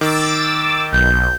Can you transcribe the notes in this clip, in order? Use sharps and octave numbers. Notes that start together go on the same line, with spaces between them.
D#3 D6 E6 A6
B1 G6